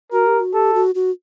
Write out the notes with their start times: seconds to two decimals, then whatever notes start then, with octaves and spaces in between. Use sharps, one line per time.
0.12 F#4 A#4
0.27 G4
0.40 F#4
0.53 G4 A4
0.74 F#4
0.95 F#4